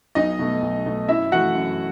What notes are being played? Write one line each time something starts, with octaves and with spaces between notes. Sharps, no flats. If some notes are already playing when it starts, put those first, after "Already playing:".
B1 D#4 D#5
B2 A3
B1
B2 A3
F#2 E4 E5
E3 A3 F#4 F#5
F#2